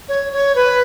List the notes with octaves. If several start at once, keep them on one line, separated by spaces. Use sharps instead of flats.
C#5
C#5
B4